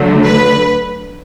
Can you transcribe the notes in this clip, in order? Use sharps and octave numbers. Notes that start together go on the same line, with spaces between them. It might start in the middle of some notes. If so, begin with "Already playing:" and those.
Already playing: D3 F#3 A3
B4